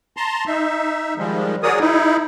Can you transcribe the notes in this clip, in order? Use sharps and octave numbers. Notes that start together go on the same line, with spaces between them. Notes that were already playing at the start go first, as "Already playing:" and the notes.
A5 A#5 C6
D#4 E5
D#3 F3 G3 G#3
F#4 G#4 A#4 C#5 D5 D#6
D#4 E4